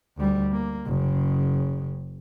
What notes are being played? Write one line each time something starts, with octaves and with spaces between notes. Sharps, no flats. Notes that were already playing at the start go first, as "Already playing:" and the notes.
D2 G3
A#3
F#1 C#3